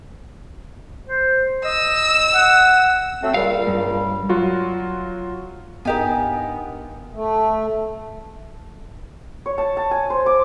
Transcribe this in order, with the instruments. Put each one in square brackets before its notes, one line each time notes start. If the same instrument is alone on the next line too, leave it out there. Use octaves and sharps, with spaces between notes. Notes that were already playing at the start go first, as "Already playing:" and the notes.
[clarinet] C5
[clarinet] D#5 [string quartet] E6
[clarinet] F#5
[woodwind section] F#3 A3 C4
[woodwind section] C#2 A#2 G3 [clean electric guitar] F5
[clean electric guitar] G2
[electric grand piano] F#3 F4 F#4
[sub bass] G2 [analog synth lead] B3 [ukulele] D#4 G4 G#5 [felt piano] A#4 D#5 F5
[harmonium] A3
[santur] C#5
A5
A5
G#5
C5
D6